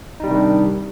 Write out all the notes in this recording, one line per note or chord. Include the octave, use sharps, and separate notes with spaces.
C3 D#3 G3 D4 D#4